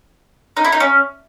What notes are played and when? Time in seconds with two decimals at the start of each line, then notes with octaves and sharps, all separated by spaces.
0.57 D#4
0.65 E4
0.72 D#4
0.80 C#4